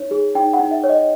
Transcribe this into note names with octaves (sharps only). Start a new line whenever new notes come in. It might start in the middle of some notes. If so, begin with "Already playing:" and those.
Already playing: D#4 C#5
G#4
D#4 G5
F#5
D#4
E5
C#5
D#5